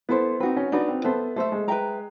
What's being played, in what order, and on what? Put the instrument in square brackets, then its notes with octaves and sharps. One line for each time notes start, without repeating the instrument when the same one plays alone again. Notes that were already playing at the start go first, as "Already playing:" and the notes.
[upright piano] B3 [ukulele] E4 A4 C5
[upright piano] C4 [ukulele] D#4 F#4 B4
[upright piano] C#4
[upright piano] D4 [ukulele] D#4 F#4 B4
[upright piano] C4
[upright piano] B3 [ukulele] A4 C5 E5
[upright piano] A3 [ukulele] A4 C5 E5
[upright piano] G#3
[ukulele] B4 E5 G5 A#5